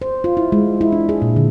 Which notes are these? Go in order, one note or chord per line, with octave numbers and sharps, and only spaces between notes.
C5
F4
E4
G#3
E4
D4
G#4
A#2
D3